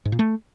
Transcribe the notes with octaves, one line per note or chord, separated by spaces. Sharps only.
G#2
A#2
A3